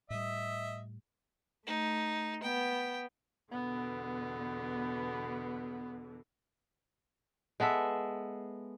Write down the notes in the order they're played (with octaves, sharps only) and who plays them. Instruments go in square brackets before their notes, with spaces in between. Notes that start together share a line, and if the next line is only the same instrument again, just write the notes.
[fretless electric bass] A2 G3 [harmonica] D#5 E5
[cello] A3 [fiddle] D#4
[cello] B3 [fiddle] G5
[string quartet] E2 B2 D3 [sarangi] B3
[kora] G#3 B3 A4 E5